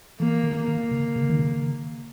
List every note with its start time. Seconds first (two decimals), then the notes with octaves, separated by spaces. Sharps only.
0.20 E3 A#3
0.44 D#3
0.57 A#3
0.68 D#3
0.92 C#3
1.16 C#3
1.29 D#3
1.40 C#3